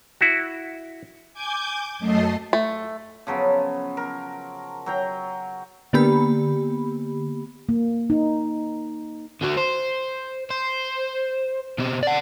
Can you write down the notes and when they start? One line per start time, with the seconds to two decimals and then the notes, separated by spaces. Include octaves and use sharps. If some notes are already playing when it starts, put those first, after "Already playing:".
0.21 E4 F#4
1.34 G#5 D6 G6 G#6
1.99 F#2 A3 D#5 A5 C7
2.53 A3
3.27 C#3 F3 F#3 B3
3.97 A#4
4.86 F#3 G5 A#5
5.93 D3 A#3 B3 G4 B5
7.69 A#3
8.10 D#4
9.42 D3 F#4
9.57 C5
10.50 C5
11.78 B2 C4
12.03 D5 F#5